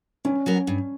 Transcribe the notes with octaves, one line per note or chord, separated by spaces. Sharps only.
G2 C#4
F#3 B3 F#4 A#4
G2